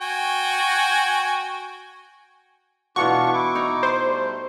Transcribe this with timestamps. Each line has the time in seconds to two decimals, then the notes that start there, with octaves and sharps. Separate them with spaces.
0.01 F#4 G5 G#5
2.96 B2 E3 D4 F4 F#4 C#6
3.33 E4 D6
3.55 D#4
3.83 C5
4.05 G3 A3